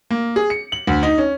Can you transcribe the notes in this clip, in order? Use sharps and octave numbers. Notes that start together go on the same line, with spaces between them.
A#3
G#4
C#7
F#7
D2
D#4
C#4